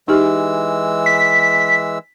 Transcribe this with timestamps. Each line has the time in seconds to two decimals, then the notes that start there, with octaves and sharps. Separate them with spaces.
0.08 E3 G#3 D#4 G4 E6
1.06 B6